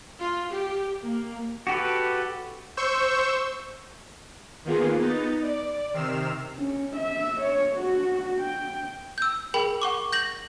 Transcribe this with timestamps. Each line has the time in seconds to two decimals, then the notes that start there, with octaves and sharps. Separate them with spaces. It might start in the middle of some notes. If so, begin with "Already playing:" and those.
0.20 F4
0.50 G4
1.02 A#3
1.67 F#4 G4 A4 B4
2.77 C5 C#6 E6 G6
4.65 D#3 A#3 B3 F4 G#4
5.00 B3 D#4 A6
5.43 D5
5.94 C3 D#3 E6 F6 C7 E7
6.57 C#4
6.96 E5
7.41 C#5
7.76 F#4
8.39 G5
9.18 E6 G6
9.54 G#4 A#4 G5 B5
9.82 F#5 C#6 D6
10.13 G6 A#6 F#7